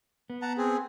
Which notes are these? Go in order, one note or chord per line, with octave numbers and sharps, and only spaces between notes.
B3
F#5 A5 A#5
C4 G#4